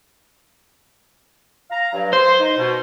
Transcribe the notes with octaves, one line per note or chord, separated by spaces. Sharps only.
F5 A#5
G2 F#3
C5 C6
D#4
B2